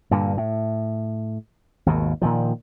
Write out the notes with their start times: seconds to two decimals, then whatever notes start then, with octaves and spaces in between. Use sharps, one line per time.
0.11 G2 A#2 D3
0.37 A2
1.86 G#1 D#2 B2
2.22 A#2 D#3 F3